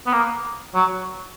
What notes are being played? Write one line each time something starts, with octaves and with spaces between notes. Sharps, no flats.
B3
A#3
F#3